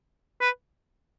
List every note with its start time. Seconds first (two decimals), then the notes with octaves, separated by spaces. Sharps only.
0.41 B4